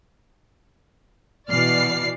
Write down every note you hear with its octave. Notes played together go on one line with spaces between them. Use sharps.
B2 E3 D5 F6 C7